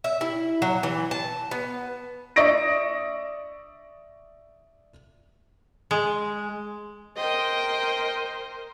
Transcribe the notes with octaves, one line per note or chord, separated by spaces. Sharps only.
E5
E4
F#3
E3
A5
B3
D5 E5 C#6 D#6 A#6 D7
G#3
A#4 C5 D#5 G5